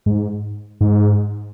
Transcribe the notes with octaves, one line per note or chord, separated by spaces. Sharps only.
G#2
G#2